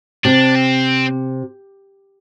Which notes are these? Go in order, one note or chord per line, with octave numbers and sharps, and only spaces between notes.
C3 D4
C4